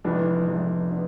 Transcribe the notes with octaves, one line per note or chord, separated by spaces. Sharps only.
F1 F2 E3 B3 D4
F1 F2 E3 B3 D4
B3 D4